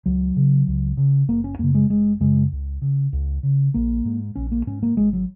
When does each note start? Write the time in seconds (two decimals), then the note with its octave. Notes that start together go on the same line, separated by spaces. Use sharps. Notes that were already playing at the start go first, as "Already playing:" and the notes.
0.06 C#2 F#3
0.37 C#3
0.67 C#2
0.97 C#3
1.28 F#1 A#3
1.44 C#4
1.59 F#2 C#3 A#3
1.75 G#3
1.90 F#1 G#3
2.20 F#2 C#3 G#3
2.52 C#2
2.82 C#3
3.13 C#2
3.43 C#3
3.74 A#1 A#3
4.05 G#2
4.36 A#1 C#4
4.52 A#3
4.67 G#2 C#4
4.83 A#3
4.97 G#1 G#3
5.13 F#3